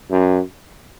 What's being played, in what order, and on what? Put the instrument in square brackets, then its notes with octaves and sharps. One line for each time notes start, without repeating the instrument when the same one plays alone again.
[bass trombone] F#2